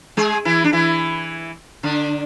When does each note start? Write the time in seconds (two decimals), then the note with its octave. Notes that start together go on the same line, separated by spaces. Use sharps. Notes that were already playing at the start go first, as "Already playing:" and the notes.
0.17 G#3 G#4
0.45 E3 E4
0.64 D4
0.73 E3 E4
1.83 D3 D4